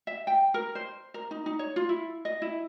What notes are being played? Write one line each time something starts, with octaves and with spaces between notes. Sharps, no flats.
E5
G5
A#4
C5
A#4
D#4
D#4
C#5
F4
E4
D#5
E4